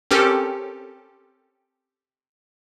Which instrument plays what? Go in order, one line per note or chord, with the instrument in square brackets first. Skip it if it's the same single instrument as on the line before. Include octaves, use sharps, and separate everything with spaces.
[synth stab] C4 C#4 G4 A4 A#4